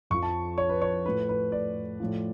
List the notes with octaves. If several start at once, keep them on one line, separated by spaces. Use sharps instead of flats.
F2 F3 C#6
A5
C#5
B4
C#5
A2 F3 B4
B4
D5
A2 F3